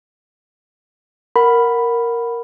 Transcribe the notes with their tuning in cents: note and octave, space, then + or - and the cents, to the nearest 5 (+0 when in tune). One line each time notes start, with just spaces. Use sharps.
A#4 +0 F#5 -5 B5 +0